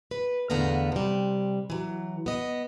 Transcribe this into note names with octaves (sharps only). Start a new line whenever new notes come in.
B4
E2 A2 D3 B3 F5 A#5
C3 G3
E3 F#3
B3 D#5